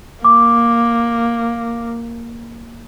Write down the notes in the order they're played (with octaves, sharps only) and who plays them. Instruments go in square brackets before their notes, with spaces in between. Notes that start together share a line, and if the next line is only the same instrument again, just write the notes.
[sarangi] A#3 [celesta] D6